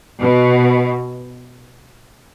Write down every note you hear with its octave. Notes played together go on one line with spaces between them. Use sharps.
B2